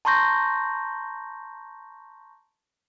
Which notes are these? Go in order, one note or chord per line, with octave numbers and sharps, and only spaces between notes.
A5 A#5 C6 C#6 G6 A#6